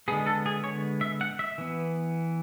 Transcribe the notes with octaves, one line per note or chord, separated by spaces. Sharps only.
D3 G#3 B3 G#4
A4
G#4
C#5
E5
F#5
E5
E3 B3